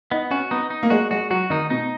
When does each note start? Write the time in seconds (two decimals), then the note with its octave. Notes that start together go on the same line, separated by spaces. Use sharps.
0.11 B3 D#4
0.31 C#4 F#4
0.51 B3 D#4
0.70 D#4
0.83 A#3
0.90 G#3 F#4
1.11 G#3 F#4
1.30 F#3 F#4
1.50 D#3 D#4
1.70 B2 D#4